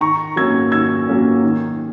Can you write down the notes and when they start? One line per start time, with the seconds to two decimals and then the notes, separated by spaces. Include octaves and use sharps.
0.01 D#3 A#5 C#6
0.36 F#3 A#3 C#4 E6 G#6
0.72 D#3 E6 G#6
1.08 F#3 A#3 C#4
1.43 D#3